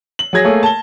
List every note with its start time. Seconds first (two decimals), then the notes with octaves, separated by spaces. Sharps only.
0.19 F#7
0.33 F#3 G#4 G#6 A#6
0.44 A3 A#3 G#4 C#5
0.63 A5 G7